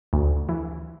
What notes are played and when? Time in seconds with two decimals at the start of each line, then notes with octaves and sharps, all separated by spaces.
0.13 D2
0.49 E3